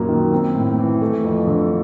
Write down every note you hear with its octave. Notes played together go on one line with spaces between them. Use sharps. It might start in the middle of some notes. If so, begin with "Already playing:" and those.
Already playing: F#2 A#2 A#3
D#3
C4
A2
E3
A3
F2
D3